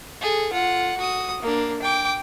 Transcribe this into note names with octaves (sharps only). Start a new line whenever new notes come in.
G#4 A4
F4 F#5
F#4 D#6
A#3 D4
G5 D6